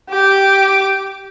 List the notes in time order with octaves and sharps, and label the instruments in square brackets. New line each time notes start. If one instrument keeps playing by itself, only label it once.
[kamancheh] G4 D6